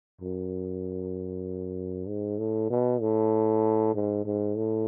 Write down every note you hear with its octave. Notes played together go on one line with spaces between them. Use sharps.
F#2
G#2
A2
B2
A2
G#2
G#2
A2